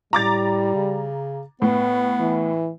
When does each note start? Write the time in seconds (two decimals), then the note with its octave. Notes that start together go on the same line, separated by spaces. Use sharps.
0.13 A2 G3 A#5 D6 A6
0.75 C#3
1.62 A2 B3 B4
2.20 E3